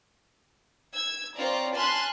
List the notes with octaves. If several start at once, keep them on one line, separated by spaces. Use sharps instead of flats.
E6 G#6
C4 F4 C#5 D5 A#5
G#5 A5 B5 C6 F6 F#6